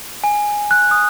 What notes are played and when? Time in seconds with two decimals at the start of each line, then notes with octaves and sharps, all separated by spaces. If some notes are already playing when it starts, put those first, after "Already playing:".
0.24 G#5
0.71 F#6
0.91 D#6